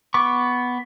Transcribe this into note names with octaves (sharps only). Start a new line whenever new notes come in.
B3 C#6 D6